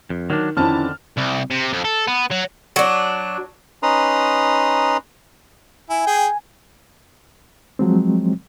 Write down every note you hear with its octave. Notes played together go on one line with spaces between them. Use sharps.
F2
D#3 F#3 D4
F2 D3 D#3 C#4 E4 A5 F6
C2
C3
F2
A4
B3
F#3
F#3 D4
C#4 D#4 B4 A#5 C6 D#6
E4 G#5
G#4 G5
F3 F#3 G#3 C4